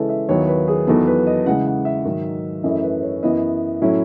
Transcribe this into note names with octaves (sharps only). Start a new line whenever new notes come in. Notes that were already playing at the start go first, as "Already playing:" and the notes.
Already playing: C#3 E3 G#3 C#4 E4 A4 B4
E5
D#2 D#3 F#3 B3 E4 C#5
B4
G#4
E2 D#3 F#3 B3 A4
B4
D#5
C#3 E3 G#3 F#5
F#5
E5
G#2 D#3 F#3
F#2 E3 A3 C#4 E4 D#5
B4
C#5
F#2 E3 B3 E4 D#5
A2 F#3 C#4 E4